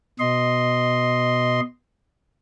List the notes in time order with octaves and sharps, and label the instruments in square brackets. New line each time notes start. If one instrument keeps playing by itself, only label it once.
[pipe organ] B2 D#5 C6